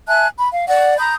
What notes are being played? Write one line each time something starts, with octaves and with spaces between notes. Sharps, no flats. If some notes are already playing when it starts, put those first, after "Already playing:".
E5 G#5 A5 F#6
B5
F5
D5 F#5
A#5 B5 D#6 G6